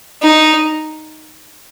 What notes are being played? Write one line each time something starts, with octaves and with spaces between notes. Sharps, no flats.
D#4